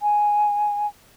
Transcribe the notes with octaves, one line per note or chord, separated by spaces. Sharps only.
G#5